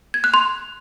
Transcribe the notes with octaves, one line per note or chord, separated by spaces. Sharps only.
G#6
F#6
C6